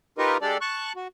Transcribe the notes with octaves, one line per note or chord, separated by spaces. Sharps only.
D#4 F4 G4 A#4 B4 D#5
G#3 D4 G4 A4 D5
A5 C#6 F#6
F#4